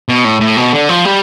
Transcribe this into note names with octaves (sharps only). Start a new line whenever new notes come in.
B2
A2
A2
B2
D3
F3
G3